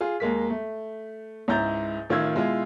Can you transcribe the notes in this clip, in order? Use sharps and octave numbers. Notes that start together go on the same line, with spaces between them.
F4 G#4
D#2 G#3 A#3 B6
A3
C#2 G#2 E4 A#5 G6 A6
A1 D#3 F4 E5 E6 G#6
B2 G#3 E4 F4